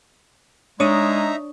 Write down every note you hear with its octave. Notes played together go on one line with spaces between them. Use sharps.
G#3 D4 D#4 C#5 E5 A#5 C#6 D#6